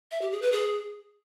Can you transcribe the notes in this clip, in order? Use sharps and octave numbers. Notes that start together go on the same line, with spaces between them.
E5
G4
G#4
B4
G#4